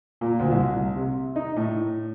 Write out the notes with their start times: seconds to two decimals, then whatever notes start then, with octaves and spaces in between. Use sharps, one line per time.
0.21 A#2
0.39 D2
0.51 C2
0.95 C3
1.36 D#4
1.56 A2